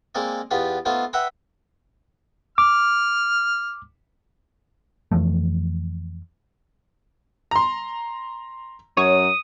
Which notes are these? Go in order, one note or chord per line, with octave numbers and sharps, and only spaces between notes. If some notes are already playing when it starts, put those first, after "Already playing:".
G#3 A#3 C4 A#4 D5 D#5
E2 B3 F4 G4 F5
A3 B3 D#4 F4 C5
B4 E5 F#5 G5 A#5 B5
D6 F6
F2 E3 F3 A3
A#5 C6
F#2 C#5 D#6